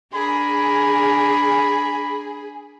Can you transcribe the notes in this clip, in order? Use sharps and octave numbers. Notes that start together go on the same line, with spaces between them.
D4 G#4 A#4 B5